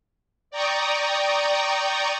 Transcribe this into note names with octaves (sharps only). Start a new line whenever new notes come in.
D5 G5 A#5 C#6 D#6